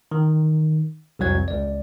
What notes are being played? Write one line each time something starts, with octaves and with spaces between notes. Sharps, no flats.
D#3
C2 F2 F#3 G#6
C#2 D5